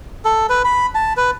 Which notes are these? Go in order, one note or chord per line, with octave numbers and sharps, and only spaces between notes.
A4
B4
B5
A5
B4